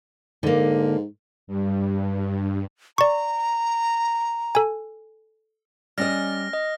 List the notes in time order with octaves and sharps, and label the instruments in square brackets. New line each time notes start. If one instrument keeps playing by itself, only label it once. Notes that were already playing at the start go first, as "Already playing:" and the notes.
[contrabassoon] G#2 [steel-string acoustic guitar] D3 A#3
[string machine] G2
[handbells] D5 C#6 [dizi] A#5
[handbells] A4 G#5
[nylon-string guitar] G3 D#5 [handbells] C#4 D5 [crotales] F6 A#6
[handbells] D#5